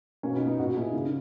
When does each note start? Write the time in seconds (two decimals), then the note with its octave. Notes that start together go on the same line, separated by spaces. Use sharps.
0.23 B2 A#3 C#4
0.35 B3 D#4
0.41 B2
0.47 B3 D#4
0.58 A#2 D#4 F#4
0.75 A#2 E4 G#4
0.93 C#3 A#3